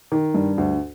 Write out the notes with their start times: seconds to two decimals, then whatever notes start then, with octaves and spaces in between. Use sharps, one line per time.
0.12 D#3
0.34 G2
0.58 D2